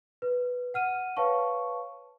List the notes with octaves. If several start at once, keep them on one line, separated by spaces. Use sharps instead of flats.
B4
F#5 F6 D#7
B4 C#5 F5 A5 C#6